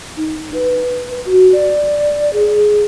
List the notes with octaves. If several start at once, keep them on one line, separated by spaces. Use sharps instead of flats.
D#4
B4
F#4
D5
G#4